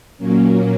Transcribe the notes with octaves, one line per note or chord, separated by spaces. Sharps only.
A#2 F#3 A#3 C#4